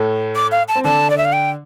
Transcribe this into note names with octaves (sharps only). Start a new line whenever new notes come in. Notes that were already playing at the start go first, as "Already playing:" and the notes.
Already playing: A2 A3
D6
F5
A5
C4
D3 D4 A5
D5
E5
F5
G5